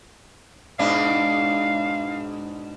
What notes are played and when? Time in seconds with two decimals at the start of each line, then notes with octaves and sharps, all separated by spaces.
0.79 G#2 B2 D4 F5